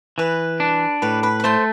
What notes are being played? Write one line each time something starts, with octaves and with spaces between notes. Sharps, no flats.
E3 B4 B5
D4
A2 B4 B5
B4 B5
B5
A3 C5 C6